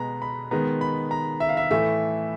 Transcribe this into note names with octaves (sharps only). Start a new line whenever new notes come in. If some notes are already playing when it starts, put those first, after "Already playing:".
Already playing: B2 G#3 B3 A#5
B5
D#3 G#3 B3 A#5
B5
A#5
E5
F5
E5
A2 E3 A3 E5